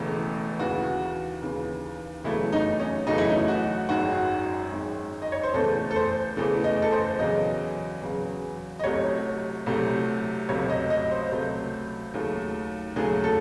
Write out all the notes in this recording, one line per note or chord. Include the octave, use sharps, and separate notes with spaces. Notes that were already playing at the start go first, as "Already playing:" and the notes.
Already playing: E1 E2 C#3 E3 A3
D#2 C#3 E3 F#4
D#2 C#3 E3
E2 C#3 F#3 A3 E4
D#4
C#4
E2 C#3 F#3 A3 D#4
E4
D#4
F#4
G#1 F#2 D#3 G#3 F#4
G#1 F#2 D#3 G#3
D#5
C#5
C5
E2 C#3 E3 A3 A4
A4
C5
E2 C#3 E3 A3
D#5
A4
C5
E2 C#3 F#3 D#5
E2 C#3 F#3
D#5
C2 C3 F#3 A3 C#5
C2 C3 F#3 A3
C#2 C3 F#3 A3 C#5
D#5
D#5
C5
C#2 C3 F#3 A3
D#2 C#3 F#3 A3
D#2 C#3 F#3 A3 G#4
A4